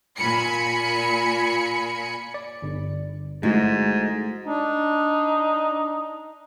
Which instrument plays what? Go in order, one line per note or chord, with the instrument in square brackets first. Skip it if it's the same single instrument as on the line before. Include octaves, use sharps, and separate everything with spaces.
[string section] A#2 G#5 B5 C#7
[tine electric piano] D5
G1
[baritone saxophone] G#2 [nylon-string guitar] G#3 [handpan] A3 E4 F#4
[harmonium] D4 [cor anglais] D#4